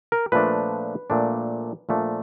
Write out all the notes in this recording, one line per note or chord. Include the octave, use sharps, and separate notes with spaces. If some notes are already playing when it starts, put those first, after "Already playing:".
A#4
A#2 F3 A3 D4 B4
A#2 F3 A3 D4
A#2 F3 A3 D4